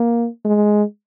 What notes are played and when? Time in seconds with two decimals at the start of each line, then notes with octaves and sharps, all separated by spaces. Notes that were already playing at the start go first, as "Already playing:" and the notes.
Already playing: A#3
0.45 G#3